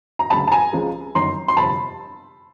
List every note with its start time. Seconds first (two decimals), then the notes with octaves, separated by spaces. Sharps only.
0.19 A#5
0.30 D2 C#3 F#3 A5 B5
0.47 A5
0.52 G#5 A#5
0.73 C#2 C#3 F3 G#3
1.15 G1 F#2 D#3 F#3 A#5 C6
1.48 C6
1.57 G1 F2 C3 A5 B5